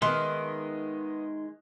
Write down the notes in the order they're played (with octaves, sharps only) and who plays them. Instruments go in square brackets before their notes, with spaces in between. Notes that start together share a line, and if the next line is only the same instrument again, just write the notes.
[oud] D#3 [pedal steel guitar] G#3 E5 C6 [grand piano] B3 D#5 F#6